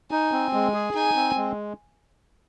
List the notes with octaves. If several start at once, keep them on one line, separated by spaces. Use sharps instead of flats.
D#4 G#5
C4
G#3
G#4
D#4 G#5
C4
G#3